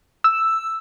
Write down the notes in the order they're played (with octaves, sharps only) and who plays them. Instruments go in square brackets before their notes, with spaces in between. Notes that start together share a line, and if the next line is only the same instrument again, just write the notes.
[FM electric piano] E6